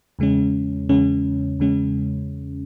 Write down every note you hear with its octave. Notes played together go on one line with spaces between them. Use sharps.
E2 C#3 G#3 C#4
E2 C#3 G#3 C#4
E2 C#3 G#3 C#4